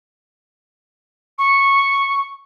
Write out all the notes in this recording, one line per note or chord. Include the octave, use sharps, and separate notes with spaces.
C#6